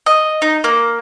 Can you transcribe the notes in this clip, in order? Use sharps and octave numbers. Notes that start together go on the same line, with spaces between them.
D#5
D#4
A#3